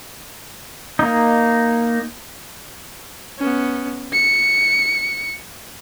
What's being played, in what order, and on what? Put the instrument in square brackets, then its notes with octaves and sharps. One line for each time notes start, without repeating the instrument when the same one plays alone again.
[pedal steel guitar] A#3 D#4
[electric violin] B3 C#4
C#7